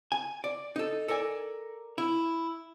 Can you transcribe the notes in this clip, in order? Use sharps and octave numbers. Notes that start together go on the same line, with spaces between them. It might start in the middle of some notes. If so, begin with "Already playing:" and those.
G#5
D5
D#4 A4
A4 A#4 D5 G#5
E4